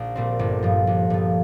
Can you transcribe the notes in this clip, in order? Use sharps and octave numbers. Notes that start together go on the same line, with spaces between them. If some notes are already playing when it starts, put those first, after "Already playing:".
Already playing: A#1
A#2 G3 C4
G1
G2 F3
G1
G2 F3